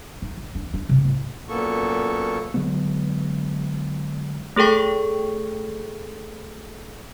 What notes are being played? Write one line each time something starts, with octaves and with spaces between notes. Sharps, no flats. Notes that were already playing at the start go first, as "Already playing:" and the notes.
D#4
A1
D4
D4
C3
A2
F#2 A#2 A#3 B3 A4 C#6
D3 F#3 G#3 B3
A3 G#4 A4 G5 C#6